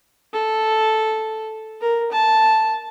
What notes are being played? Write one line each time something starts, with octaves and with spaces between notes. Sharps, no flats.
A4
A#4
A5